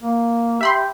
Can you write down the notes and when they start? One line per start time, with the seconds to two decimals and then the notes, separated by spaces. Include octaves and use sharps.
0.03 A#3
0.61 G4 E5 B5 C6